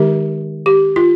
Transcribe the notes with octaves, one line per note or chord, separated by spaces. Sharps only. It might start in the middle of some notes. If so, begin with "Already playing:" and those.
Already playing: D#3 G#3 D#4 G4 A#4
G4
F4